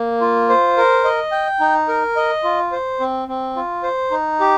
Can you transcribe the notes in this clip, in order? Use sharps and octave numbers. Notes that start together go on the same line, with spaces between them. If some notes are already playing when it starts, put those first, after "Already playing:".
Already playing: A#3
F4
C5
A#4
D#5
G5
D#4
A#4
D#5
F4
C5
C4
C4
F4
C5
D#4
G4